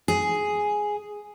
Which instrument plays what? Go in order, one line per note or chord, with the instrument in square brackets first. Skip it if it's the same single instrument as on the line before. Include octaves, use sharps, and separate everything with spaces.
[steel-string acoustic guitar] G#4